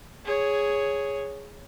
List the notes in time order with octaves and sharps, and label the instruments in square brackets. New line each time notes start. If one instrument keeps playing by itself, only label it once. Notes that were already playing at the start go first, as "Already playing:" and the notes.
[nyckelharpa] G#4 C#5